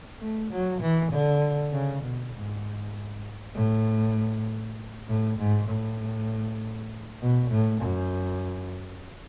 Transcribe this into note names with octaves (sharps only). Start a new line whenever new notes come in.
A3
F#3
E3
D3
C#3
B2
G#2
A2
A2
G#2
A2
B2
A2
F#2